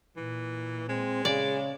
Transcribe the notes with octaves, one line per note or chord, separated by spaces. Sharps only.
A#2 E3
G#3 C4
C#3 D5